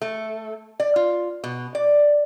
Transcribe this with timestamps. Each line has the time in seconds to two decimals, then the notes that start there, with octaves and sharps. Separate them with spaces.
0.02 A3
0.80 D5
0.96 F4
1.44 B2
1.75 D5